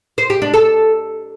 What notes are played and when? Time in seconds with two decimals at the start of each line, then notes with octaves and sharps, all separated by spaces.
0.18 C5
0.30 G4
0.42 D4
0.54 A4